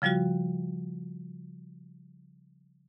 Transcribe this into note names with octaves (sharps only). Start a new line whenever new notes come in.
C#3 F3 G3 F4 F#4